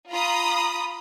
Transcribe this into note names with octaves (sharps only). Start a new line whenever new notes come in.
F4 A#5 B5 D#6